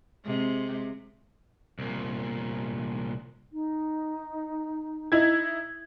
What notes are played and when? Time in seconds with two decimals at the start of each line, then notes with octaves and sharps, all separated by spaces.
0.24 C3 G#3
1.79 C2 A#2
3.51 D#4
5.12 D#4 E4 G#6